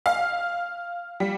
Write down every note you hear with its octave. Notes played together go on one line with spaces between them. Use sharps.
F5
G3